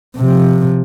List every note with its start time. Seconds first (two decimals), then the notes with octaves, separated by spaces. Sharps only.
0.17 C3 F3